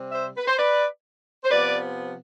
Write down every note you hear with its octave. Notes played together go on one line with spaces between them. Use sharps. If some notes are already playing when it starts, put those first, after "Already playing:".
Already playing: C3 G3 C4
C5 E5
B4
C5
B4 D5
C5
C3 F3 B3 B4 D5